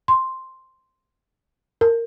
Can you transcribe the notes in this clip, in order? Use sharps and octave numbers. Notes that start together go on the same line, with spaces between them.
C6
A#4